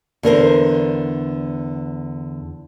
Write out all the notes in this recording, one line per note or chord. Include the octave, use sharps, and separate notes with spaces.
E2 D3 A#4 C5